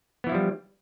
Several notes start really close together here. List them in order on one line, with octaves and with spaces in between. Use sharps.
B3 E3 E4 F3 G3